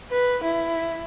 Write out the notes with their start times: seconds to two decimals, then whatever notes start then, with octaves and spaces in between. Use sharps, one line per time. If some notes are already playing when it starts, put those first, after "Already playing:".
0.11 B4
0.44 E4